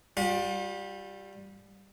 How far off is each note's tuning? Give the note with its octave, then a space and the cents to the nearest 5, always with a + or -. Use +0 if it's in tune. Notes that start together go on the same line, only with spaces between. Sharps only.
G3 +0 F4 +45